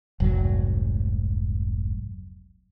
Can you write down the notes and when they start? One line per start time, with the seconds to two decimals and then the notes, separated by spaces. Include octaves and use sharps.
0.20 F1 C2 G#2 F#3